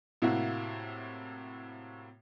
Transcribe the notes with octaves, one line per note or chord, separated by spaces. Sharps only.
A2 C3 A#3 E4 F#4